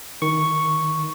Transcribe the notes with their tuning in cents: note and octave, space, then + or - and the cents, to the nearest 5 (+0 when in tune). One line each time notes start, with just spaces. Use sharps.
D#3 +15 C#6 +0